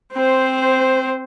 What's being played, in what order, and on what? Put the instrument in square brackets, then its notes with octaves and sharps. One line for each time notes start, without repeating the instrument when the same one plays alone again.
[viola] C4 C5